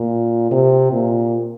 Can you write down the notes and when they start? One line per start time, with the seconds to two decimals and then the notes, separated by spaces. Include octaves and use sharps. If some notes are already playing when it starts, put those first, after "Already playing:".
Already playing: A#2
0.51 C3
0.92 A#2